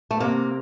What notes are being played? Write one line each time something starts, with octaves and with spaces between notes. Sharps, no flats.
A3
C3 A#3